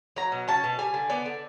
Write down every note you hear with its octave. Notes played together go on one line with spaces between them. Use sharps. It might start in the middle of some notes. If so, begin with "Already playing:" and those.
F#3 A#5
B2
C#4 A5
B2
G3 G#5
D3
B3 D5
D3